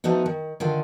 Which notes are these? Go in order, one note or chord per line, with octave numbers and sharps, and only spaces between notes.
F3 A3 B3 D#4 F#4
D#3
D3 D#3 F4